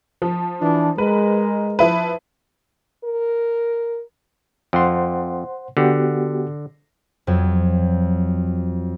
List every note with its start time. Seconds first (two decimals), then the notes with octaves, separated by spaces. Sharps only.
0.22 F3
0.61 E3 D4
0.98 G#3 A#4 B4
1.79 F3 E4 B4
3.04 A#4
4.73 F2 C5 F#5 C6
5.77 D3 B3 F#4 G4
7.27 F2 F#3